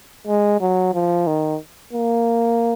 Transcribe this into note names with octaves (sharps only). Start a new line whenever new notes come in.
G#3
F#3
F3
D#3
A#3